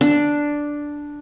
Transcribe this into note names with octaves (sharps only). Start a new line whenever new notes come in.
D4